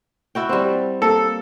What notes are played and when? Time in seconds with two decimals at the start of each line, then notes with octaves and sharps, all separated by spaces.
0.35 E4 F#4 G5
0.49 G3 C4
1.02 A#3 A4